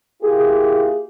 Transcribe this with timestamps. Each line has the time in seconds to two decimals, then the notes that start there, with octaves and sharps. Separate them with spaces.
0.23 A#3 E4 F4 G4 G#4